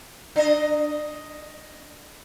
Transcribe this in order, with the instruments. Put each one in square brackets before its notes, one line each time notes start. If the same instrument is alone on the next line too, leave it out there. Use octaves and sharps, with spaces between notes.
[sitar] D4 D#5